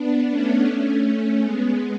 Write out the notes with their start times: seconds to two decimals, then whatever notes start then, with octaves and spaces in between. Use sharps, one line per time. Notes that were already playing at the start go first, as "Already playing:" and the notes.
Already playing: B3 D4
0.30 A3 C#4
1.41 G#3 B3